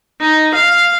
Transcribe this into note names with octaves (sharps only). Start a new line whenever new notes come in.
D#4
F5